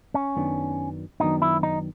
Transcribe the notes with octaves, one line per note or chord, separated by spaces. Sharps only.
C#4
F#2 D#3 F#3 B3 D4
F#2 D#3 F#3 B3 D4 D#4
E4
D#4